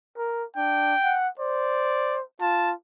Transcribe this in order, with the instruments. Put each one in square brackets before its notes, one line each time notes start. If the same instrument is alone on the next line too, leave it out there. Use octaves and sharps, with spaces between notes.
[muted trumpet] A#4
[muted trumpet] D4 [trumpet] G5
[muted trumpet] F#5
[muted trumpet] C5 [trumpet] D5
[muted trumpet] F4 [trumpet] A5